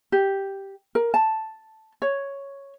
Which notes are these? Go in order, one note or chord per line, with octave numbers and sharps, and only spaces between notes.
G4
A#4
A5
C#5